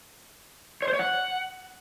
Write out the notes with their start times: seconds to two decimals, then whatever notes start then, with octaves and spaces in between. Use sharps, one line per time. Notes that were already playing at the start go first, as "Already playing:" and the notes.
0.82 C#5
0.88 C5
0.94 C#5
0.99 F#5